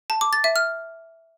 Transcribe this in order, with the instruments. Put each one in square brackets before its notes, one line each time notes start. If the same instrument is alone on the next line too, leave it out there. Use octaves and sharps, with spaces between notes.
[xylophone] A5
D6
A6
E5
F6